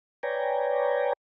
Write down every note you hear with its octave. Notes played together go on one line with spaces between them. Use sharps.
B4 C#5 D5 G5 G#5 A#5